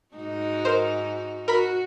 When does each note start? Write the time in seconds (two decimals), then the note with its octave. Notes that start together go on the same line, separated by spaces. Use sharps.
0.15 G#2 D#4 F#4
0.65 A#4 C5
1.48 F#4 A#4 B5 B6